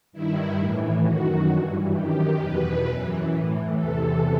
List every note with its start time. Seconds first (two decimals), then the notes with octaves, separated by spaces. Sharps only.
0.12 G2 D#3 E4
0.58 A2 E3
1.03 F#2 D#3 F#4
1.49 G2 E3
1.93 F#2 D#3 G4
2.40 E2 B2 B4
2.85 F#2 E3
3.29 A2 E3
3.75 E2 C3 E3 A4